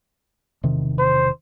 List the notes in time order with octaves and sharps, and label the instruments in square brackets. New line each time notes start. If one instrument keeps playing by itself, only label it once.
[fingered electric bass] E1 C3 D#3
[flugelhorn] C5